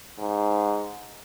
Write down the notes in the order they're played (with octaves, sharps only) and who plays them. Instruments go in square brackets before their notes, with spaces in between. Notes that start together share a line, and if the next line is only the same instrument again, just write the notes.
[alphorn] G#2